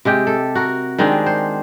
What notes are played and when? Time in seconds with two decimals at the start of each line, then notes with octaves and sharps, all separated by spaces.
0.05 C3 G#3 G4 G5
0.27 A4
0.55 F#4 A#4
0.99 D#3 G#3 C4 D4
1.26 C5